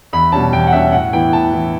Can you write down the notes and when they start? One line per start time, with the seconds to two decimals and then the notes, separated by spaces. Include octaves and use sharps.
0.13 E2 B5
0.32 B2 G3 C#4 A5
0.53 E2 G5
0.67 F#5
0.72 B2 G3 C#4 E5
0.92 A2 F#5
1.13 E3 B3 E4 G5
1.33 A2 A5
1.53 E3 B3 E4